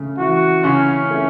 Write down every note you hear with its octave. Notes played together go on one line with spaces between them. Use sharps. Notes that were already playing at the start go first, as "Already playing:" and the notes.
Already playing: C#3 A3
E3 F#4
C#3 C#4
A3